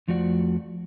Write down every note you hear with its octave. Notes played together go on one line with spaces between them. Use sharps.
F2 F3 A3 F#4 D5 F#5